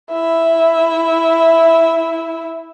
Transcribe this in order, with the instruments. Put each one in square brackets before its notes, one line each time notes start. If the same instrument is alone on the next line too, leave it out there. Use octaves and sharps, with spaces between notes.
[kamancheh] E4 E5